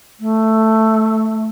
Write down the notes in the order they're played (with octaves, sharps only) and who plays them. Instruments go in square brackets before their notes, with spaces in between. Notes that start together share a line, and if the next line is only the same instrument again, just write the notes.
[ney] A3